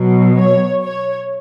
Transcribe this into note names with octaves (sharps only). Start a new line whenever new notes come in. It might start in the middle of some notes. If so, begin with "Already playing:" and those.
Already playing: B2 F#3
C#5
C#5